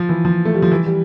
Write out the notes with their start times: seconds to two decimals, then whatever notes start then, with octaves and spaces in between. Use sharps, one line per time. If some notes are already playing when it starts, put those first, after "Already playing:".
Already playing: F3
0.09 E3
0.25 F3
0.45 A3
0.54 G3
0.62 F3
0.72 E3
0.86 G3